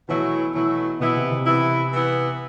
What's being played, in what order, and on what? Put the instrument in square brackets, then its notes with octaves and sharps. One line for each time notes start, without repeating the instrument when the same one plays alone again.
[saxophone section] B2 F#3 A3 E4 [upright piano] E3
[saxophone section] B2 F#3 A3 E4 [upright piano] E3
[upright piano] B2 [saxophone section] E3 B3 E4
[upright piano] C3
C3
[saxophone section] E3 B3 E4
E3 B3 E4